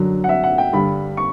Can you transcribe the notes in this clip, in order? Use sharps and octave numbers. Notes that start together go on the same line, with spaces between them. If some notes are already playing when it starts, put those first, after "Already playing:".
Already playing: F#2 D3 F#3
F#5
E5
F#5
G5
G2 D3 G3 B5
C#6